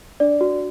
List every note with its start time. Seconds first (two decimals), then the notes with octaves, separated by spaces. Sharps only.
0.20 D4 D5
0.41 F#4